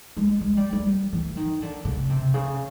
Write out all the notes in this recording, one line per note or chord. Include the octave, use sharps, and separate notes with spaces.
G#3
G#3
G3
G3
E3
D#3
D3
C#3
C3
C#3